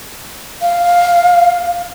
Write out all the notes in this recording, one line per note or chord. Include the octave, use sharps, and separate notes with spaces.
F5